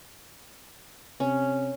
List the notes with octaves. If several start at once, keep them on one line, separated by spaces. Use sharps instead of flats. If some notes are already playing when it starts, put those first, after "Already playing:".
C3 C#4